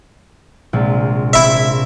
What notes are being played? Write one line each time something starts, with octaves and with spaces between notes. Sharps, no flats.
A#1 C3 G#3
C4 E4 E5